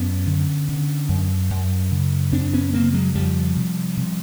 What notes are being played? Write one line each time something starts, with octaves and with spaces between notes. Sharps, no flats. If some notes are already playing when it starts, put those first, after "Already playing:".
Already playing: F#2 B3 C#4
D3
D3
F#2
F#2
C#3
F#2 C4 D4
B3 C#4
C#3 A#3 C4
F#3 G#3
F2 F3 G3
C3
C3